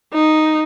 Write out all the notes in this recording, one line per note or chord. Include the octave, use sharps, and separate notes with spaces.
D#4